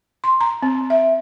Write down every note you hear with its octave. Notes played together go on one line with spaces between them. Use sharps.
C6
A#5
C4
E5